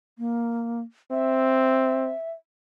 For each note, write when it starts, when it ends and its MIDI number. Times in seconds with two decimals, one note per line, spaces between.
0.19 0.81 58
1.12 2.13 60
1.12 2.30 76